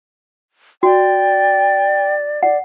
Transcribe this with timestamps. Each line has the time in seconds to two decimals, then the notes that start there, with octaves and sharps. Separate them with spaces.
0.83 F#4 D5 G5
2.43 D5 F#5